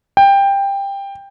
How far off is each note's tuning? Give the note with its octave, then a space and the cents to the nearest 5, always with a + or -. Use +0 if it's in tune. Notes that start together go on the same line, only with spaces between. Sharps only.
G5 +15